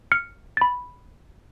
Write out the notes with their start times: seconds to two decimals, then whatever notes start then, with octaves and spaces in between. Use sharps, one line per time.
0.12 F6 C#7
0.57 B5 A6